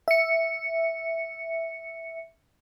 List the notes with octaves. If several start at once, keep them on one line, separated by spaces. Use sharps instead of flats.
E5 C#7